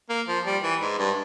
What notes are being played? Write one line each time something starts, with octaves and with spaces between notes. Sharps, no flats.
A#3
F3
G3
E3
G#2
G2